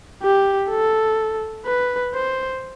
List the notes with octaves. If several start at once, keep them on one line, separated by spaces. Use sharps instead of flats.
G4
A4
B4
C5